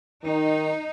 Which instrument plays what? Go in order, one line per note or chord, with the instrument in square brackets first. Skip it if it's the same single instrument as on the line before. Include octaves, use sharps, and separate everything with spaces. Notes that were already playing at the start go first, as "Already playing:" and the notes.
[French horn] D#3 [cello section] D#4